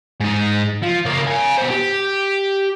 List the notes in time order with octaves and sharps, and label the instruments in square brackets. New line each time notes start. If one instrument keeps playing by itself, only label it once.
[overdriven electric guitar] G#2 D#4
F3
C#3 A#3
F5 G#5
B2 C5
G4